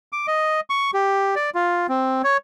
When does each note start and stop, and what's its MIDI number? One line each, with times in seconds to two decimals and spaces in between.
0.12 0.27 86
0.27 0.60 75
0.70 0.91 85
0.94 1.35 67
1.36 1.50 74
1.55 1.87 65
1.89 2.22 60
2.24 2.37 73